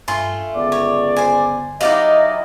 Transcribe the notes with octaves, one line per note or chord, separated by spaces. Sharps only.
G2 A3 F4 G#5 C6
G1 C#2 B3 D5
C#5
C5 G#5
F#3 D#4 E4 G4 D5 D#5 F5